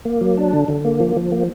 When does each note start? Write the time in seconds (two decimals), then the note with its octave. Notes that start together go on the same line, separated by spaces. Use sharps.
0.05 A#3
0.21 F#3
0.37 D4
0.53 D3
0.68 D3
0.85 A#3
1.00 F3
1.16 F3
1.32 A#3